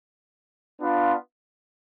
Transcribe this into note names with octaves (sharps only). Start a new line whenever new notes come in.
B3 D4 F4